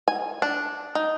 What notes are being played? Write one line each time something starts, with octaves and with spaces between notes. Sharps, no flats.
G#5
D4
D#4